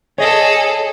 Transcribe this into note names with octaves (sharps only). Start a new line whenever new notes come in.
G#4 A4 C#5 D#5